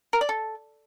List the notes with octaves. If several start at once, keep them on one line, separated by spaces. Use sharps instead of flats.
A#4
D5
A4